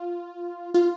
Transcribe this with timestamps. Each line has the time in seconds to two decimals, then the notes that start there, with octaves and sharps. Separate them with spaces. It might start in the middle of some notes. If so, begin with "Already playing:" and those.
Already playing: F4
0.74 F4